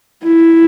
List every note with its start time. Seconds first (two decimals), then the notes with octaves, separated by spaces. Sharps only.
0.24 E4